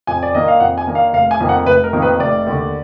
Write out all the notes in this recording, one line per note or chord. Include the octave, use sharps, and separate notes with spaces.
F2 G#5
D5
D#3 A#3 D4 D#5
F5
F2 F#5
G#5
D#3 A#3 D4
F5
F1 F5
G#5
F2 D#3 A#3
F#5
F1 B4
A#4
F2 D#3 A#3
B4
F1 D5
D#2 D3